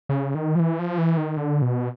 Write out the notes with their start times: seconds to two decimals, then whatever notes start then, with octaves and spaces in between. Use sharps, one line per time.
0.09 C#3
0.35 D#3
0.55 F3
0.60 E3
0.79 F3
0.98 E3
1.17 D#3
1.37 D3
1.62 B2